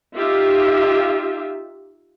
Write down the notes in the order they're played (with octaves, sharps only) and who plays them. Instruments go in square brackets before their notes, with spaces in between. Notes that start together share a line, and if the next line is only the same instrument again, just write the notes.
[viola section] D#4 F4 G4 E5